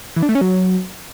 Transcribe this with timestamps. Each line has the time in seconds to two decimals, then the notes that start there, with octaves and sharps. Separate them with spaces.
0.16 E3
0.23 D4
0.29 A3
0.35 C#4
0.41 F#3